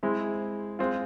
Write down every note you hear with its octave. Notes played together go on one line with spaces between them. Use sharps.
G#3 C4 E4
G#3 C4 F4